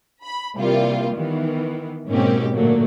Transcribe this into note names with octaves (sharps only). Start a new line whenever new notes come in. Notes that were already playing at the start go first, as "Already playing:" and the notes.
B5
C3 E3 G3 A#3 F4
D#3 E3 B3
G#2 B2 A#3 C4 C#4 G4
A#2 D3 F#3 A3 A#3